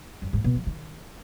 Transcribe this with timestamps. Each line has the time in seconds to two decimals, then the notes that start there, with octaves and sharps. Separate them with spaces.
0.22 F#2
0.33 G#2
0.44 B2
0.56 F3
0.67 D#3